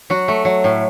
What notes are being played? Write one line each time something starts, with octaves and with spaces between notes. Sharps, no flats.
F#3 F#4
A3
F#3
A2